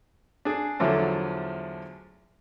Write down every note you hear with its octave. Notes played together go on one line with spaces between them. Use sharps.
D4 G#4
E2 D3 F3 F#3 A3